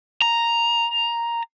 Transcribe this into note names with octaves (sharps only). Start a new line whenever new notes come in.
A#5